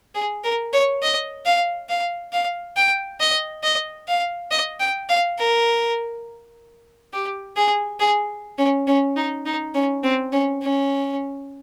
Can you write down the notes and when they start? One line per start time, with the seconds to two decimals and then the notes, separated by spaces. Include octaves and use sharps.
0.14 G#4
0.44 A#4
0.73 C#5
1.02 D#5
1.45 F5
1.89 F5
2.32 F5
2.76 G5
3.20 D#5
3.63 D#5
4.08 F5
4.51 D#5
4.80 G5
5.09 F5
5.38 A#4
7.13 G4
7.56 G#4
8.00 G#4
8.58 C#4
8.87 C#4
9.16 D#4
9.46 D#4
9.74 C#4
10.03 C4
10.32 C#4
10.62 C#4